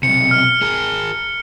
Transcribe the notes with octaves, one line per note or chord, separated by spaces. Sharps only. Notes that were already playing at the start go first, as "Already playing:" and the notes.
B1 C3 C#7
F6
G#4 A#4